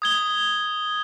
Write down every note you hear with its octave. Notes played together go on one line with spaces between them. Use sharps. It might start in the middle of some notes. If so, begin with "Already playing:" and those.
D#6 G#6 G7